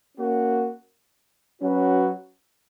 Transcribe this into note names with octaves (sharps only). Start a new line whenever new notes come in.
A#3 C#4 F#4
F#3 C#4 F#4 B4